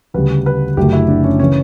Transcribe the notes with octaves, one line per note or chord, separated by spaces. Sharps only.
D2 C#3 G3 B4
B4
F#1 F#2 D3 F#3 A3 G4
E4
D4
C#4
C#3 E3 C#4